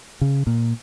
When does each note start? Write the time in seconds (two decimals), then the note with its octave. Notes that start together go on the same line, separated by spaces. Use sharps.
0.21 C#3
0.47 A#2